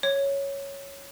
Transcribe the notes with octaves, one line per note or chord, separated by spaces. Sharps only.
C#5